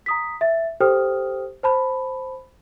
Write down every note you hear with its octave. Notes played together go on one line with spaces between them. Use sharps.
A#5 D#6 B6
E5 A6
G4 A4 C5 G5 D#6 F6
C5 A5 B5